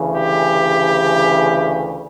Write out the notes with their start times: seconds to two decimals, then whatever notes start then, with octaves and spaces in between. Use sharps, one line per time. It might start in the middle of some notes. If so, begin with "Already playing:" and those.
Already playing: D2 C#3 E3
0.15 G4